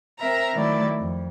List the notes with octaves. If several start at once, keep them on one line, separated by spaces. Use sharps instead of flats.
C4 A#4 E5 A#5
D#3 F#3 A3 E4 D5
F2